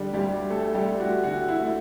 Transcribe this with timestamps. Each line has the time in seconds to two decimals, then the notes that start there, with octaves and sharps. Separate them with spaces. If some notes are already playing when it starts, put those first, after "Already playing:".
Already playing: D3 G3 G4
0.13 D2 G3 G4
0.50 A3 A4
0.75 G3 G4
0.87 A3
1.00 F#4
1.24 D3 F#4
1.48 E4
1.60 A3